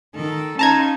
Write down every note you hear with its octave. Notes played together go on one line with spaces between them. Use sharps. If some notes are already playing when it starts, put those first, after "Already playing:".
D#3 A4
C#4 D#4 F4 A5 A#5 G#6